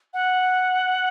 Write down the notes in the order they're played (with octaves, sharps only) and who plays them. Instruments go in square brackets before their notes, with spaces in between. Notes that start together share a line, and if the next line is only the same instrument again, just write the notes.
[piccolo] F#5